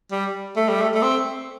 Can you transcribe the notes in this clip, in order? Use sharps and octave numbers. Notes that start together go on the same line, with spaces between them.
G3
A3
G3
A3
A3
C4